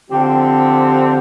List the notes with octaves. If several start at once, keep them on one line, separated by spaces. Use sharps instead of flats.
D3 F3 C4 G4